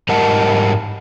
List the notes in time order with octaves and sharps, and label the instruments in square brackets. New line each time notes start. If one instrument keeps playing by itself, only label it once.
[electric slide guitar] G#2 G3 A#4 D#5 F#5 A5